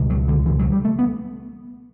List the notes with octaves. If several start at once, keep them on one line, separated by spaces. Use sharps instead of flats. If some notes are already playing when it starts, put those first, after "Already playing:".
Already playing: C#2 B2
F#3
D3
E3
F#3
G3
A3
B3